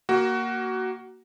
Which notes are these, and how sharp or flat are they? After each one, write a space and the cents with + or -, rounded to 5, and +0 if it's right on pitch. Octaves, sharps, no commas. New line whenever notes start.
A#3 +0 F#4 +15